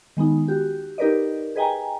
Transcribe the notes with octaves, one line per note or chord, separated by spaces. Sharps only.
D#3 G#3 B3 D#4
F#4 G4
D#4 G4 A#4 B4 D5 D#5
G#4 B4 D#5 G5 G#5 A#5